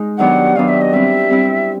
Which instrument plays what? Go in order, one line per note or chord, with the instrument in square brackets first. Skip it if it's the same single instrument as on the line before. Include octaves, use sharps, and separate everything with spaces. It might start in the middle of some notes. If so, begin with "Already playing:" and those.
Already playing: [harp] G#3 D#4
[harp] D#3 F#3 B3 D4 G4 [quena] F#5
[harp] D#3 F#3 B3 D4 G4 [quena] F5
[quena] E5
D#5
[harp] G3 C4 E4 [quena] E5
[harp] G3 C4 E4